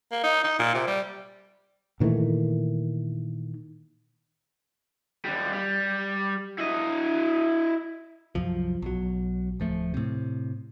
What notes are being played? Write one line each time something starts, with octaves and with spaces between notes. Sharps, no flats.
A#3
D#4
D#4
A#2
C3
G3
A#2 D#3 E3 A3
D#2 G3
G3
E4 D#5
C2 F#2 F3
B1 F#3
D1 F3 A3
A2 C3